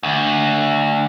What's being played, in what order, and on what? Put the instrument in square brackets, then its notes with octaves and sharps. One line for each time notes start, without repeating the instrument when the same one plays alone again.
[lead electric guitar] D2